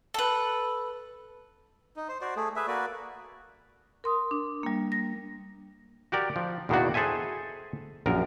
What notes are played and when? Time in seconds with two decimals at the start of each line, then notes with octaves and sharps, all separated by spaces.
0.14 A4 B4
1.96 D#4
2.09 C5
2.21 F#4 C5 D5
2.36 A3 G#4
2.56 G#4 B4 E5
2.67 A#3 F#4 B4 D5
4.04 A#4 C6 D#6
4.31 D4
4.63 G3 A#3
4.92 A#6
6.12 F#4 G4 A#4 D5
6.36 F3
6.69 E2 B2 D#3 A#3 D4 F#4
6.94 G#4 A4 C5 E5 G#5
8.06 A#1 F#2 A#4